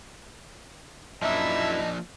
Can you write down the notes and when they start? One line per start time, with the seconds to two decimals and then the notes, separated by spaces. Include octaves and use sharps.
1.23 F#2 F3 A#3 D4 E4 D#5 E5 A#5